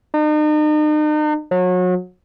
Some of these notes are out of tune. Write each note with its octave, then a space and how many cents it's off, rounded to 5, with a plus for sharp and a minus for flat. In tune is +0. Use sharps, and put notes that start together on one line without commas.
D#4 -40
F#3 -30